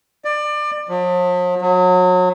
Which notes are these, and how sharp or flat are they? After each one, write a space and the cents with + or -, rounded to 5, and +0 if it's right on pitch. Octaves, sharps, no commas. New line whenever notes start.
D5 +25
F3 +45
F#3 -30